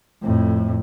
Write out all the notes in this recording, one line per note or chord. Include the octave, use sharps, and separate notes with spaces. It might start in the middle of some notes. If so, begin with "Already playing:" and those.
F2 A2